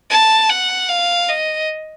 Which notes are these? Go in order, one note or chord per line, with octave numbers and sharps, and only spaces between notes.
A5
F#5
F5
D#5